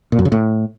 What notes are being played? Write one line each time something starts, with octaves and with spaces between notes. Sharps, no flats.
A#2
F#2
C#3
A2